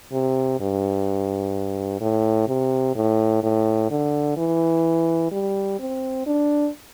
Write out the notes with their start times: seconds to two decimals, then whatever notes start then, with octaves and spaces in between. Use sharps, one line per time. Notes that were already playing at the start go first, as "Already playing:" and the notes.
0.12 C3
0.60 G2
2.01 A2
2.48 C3
2.95 A2
3.43 A2
3.91 D3
4.37 E3
5.31 G3
5.79 C4
6.26 D4